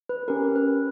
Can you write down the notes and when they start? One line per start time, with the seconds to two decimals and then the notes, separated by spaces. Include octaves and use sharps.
0.09 B4
0.28 C#4 G4 A#4
0.56 B4